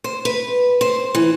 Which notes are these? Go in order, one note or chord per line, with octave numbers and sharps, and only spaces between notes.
C5
B4
C5
E3